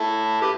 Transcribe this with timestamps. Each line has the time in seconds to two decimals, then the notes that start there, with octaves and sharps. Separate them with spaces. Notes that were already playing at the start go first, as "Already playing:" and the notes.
Already playing: E4 A4
0.41 G4 B4